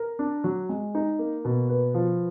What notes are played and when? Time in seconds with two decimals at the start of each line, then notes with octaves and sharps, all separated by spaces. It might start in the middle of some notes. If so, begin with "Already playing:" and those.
Already playing: A#4
0.19 D4
0.44 F#3
0.69 G#3
0.95 D#4
1.19 A#3
1.45 B2
1.69 B4
1.94 F3